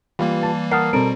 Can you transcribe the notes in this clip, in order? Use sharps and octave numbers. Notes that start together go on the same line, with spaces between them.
E3 G3 A#3 F4 G4 B4
A5
A#4 F#5 A5 D#6 F6 C7
B2 G3 C4 A4 A#5 D7